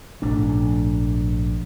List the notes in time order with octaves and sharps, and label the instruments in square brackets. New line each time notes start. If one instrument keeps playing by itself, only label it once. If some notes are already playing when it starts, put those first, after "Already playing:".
[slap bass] A#1 G#2 A3 D4